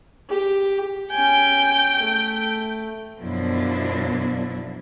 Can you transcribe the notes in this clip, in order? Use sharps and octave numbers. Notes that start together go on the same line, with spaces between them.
G4
C#4 G5 G#5
A3
F#2 B2 F3 F#3 D4 E4